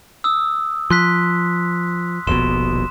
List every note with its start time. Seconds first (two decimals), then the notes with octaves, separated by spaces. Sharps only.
0.24 D#6 E6
0.90 F3 C6 F#6 B6
2.27 D#1 A#1 B2 C6 E7